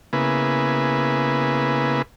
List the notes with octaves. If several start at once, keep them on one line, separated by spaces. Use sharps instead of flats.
C#3 A#3 B3 E4 G#4 B4